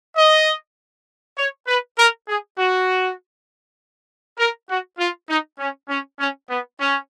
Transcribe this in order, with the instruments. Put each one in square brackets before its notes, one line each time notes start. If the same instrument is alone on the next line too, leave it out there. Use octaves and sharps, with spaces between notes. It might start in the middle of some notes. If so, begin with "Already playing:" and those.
[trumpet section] D#5
C#5
B4
A#4
G#4
F#4
A#4
F#4
F4
D#4
C#4
C#4
C#4
B3
C#4